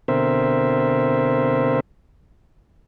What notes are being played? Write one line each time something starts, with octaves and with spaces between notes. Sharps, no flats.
B2 D3 C4 A#4 C5 E5